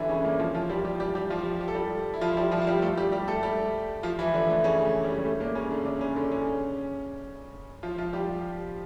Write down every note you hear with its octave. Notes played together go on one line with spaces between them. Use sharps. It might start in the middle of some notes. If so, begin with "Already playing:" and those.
Already playing: D3 E3 G3 D4 E4
C#3 C#4
A#2 A#3
F3 F4
F3 F4
G3 G4
G3 G4
G3 G4
G3 G4
F3 F4
G4
A4
G3 G4
E4
F3 F4
G3 G4
F3 F4
F4
G3 G4
A3 A4
G3 G4
G3 G4
A3 A4
G3 G4
F3 F4
E3 E4
D3 D4
A3
C#3 C#4
A3
G3
G3
A3
A#2 A#3
C#3 C#4
D3 D4
D3 D4
C#3 C#4
D3 D4
C#3 C#4
F3 F4
F3 F4
G3 G4